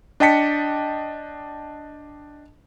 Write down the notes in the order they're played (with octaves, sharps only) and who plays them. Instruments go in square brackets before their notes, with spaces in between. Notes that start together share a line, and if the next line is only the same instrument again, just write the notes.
[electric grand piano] D4 D#5 G5 A5 B6 C#7